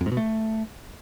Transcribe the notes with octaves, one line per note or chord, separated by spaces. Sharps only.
F2
G#2
B2
A3